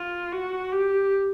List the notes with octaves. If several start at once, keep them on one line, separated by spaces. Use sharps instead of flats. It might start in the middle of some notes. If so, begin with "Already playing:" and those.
Already playing: F4
F#4
G4